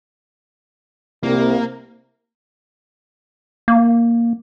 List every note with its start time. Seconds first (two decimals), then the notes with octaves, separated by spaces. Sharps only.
1.23 C2 A#3
3.68 A#3